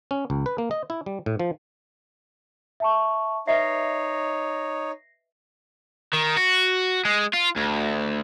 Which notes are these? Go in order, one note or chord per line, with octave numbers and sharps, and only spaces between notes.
C#4
C#2
B4
A#3
D#5
E4
G3
A2
F3
E5 A5 C#6
D#4 B4 C#5 D#5 E5 A#6 C7
D#3
F#4
G#3
F4
D2